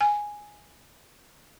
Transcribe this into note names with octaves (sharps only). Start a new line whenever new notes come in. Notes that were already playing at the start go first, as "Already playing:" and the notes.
G#5